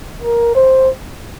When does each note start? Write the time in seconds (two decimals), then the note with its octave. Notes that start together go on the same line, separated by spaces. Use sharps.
0.22 A#4
0.55 C5